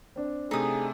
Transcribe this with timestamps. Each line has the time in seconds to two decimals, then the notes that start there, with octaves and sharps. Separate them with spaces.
0.16 C4 D4
0.51 C3 A3 D#4 G#4 D#6